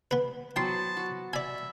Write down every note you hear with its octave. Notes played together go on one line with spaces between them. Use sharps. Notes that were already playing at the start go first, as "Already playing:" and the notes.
B3 B4
F#3 B3 C5 G5 A5 C6
F#4
D5 E5 G#5 B5